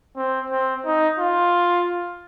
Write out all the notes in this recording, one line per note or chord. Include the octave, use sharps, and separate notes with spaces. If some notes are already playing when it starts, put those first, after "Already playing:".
C4
C4
D#4
F4